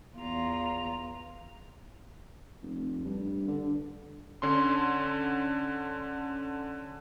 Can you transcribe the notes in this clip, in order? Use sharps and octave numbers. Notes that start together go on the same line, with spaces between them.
E2 F4 A#5
F1
G2
D3
D3 C#4 C6